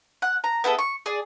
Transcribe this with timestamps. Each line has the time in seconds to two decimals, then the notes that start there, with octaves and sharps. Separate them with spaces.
0.22 F#5 F#6
0.44 A#5
0.64 B3 E4 G#4 A4
0.79 C#6
1.06 G#4 D5